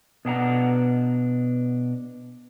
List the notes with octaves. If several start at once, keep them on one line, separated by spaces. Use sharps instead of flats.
B2 D4 F#5 A#5